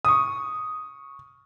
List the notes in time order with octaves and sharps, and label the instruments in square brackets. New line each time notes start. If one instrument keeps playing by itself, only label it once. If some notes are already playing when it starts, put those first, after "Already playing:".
[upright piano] C#6 D#6